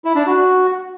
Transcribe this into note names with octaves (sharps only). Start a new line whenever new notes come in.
E4
D4
F#4